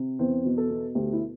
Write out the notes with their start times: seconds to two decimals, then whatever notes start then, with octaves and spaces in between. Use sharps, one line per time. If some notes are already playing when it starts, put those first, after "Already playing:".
Already playing: C3
0.19 E2 C4
0.45 B2
0.58 A4
0.71 B2
0.95 D2 G4
1.13 E4